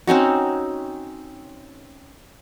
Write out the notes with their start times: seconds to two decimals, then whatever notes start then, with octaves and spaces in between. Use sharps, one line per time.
0.07 C4 C#4 D#4 F#4